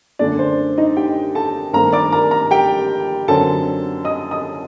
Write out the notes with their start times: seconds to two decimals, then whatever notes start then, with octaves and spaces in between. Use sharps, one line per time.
0.19 F#2 D3 A3 D4 D5
0.39 C5
0.78 D#4 D#5
0.97 G4 G5
1.35 A4 A5
1.73 G2 D#3 A3 C4 A#4 A#5
1.93 D5 D6
2.12 A#4 A#5
2.31 A#4 A#5
2.51 G4 G5
3.28 F#2 D3 F#3 C4 A4 A5
4.04 D#5 D#6
4.31 D#5 D#6